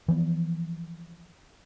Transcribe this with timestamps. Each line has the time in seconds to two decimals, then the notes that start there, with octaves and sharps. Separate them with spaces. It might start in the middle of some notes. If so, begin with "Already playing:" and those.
0.08 E3 F3 A#3 B3